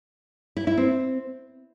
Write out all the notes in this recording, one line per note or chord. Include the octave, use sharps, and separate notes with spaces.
E4
E4
C4